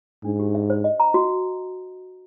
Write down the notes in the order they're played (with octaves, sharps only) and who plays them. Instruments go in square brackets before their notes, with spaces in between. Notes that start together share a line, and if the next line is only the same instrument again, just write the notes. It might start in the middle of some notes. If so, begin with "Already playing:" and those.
[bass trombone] G#2 [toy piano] D4
[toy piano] G4
E5
C5
D#5
A#5
F#4